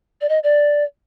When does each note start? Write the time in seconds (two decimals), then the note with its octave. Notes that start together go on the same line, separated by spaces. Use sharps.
0.21 D5
0.29 D#5
0.43 D5